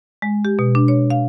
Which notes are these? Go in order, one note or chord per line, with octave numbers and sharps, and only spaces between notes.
G#3
G4
B2
D4
C#5
F5